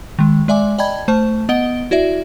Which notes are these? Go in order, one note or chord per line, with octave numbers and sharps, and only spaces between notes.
D#3 G#3
G#3 D5 E5 G#5 D6
D5 D#5 G5 A5 B5 G#6
A3 C5 A5
B3 D#5 F#5 D7 G7
E4 F#4 D5 E5